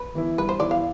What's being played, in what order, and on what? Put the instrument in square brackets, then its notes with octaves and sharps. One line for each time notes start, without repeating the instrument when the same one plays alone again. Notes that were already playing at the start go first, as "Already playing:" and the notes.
Already playing: [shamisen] B4
[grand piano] E3 B3 E4
[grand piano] G2 [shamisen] B4
[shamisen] C5
[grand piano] E3 B3 E4 [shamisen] D5
[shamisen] F5